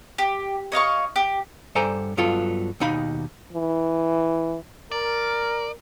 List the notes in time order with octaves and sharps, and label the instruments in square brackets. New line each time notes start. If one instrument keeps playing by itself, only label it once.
[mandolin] G4
C#5 D#5 F5 C#6
G4
[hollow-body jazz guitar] G2 A4 C5 D5 G#5 A#5
G2 F#3 B3 F4 A4
D#2 B2 D#4 F5 B5
[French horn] E3
[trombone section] A#4 [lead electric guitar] D5